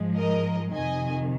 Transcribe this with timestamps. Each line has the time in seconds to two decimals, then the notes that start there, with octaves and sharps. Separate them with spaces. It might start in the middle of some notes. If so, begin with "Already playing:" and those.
Already playing: G#2 F3 G#3
0.17 A#4 D#5
0.72 F2 C3 D#3 D#5 G#5